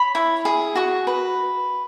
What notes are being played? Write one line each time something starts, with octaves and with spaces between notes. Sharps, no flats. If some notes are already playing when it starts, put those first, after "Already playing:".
Already playing: C#5 B5
E4
G#4
F#4 C#6
B4